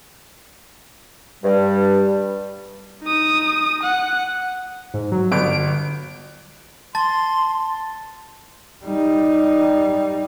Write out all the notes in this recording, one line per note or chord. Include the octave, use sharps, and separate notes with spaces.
G2 G3
D#4 D#6
F#5
G#2
F#3
G1 D7
A5 C6 A6
G3 D#4